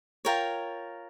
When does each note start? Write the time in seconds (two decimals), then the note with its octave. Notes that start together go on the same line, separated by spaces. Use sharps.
0.25 F4 A#4 C#5 G5